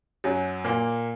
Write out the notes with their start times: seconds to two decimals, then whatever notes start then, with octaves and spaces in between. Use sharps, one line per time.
0.24 F#2 F#3
0.64 A#2 A#3